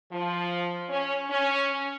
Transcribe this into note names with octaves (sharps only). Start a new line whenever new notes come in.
F3
C#4
C#4